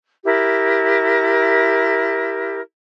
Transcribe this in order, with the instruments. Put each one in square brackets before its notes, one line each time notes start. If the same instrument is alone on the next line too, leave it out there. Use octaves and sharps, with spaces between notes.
[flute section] E4 G4 A#4